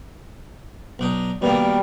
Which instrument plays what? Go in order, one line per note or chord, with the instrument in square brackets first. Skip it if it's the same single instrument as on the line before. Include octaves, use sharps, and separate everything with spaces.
[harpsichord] B1 D4 D#4
[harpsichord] B2 D#3 A#3 [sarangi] G3